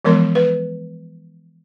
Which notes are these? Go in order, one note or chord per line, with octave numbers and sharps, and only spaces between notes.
E3 F3 G#3 B3 A#4 C6
B4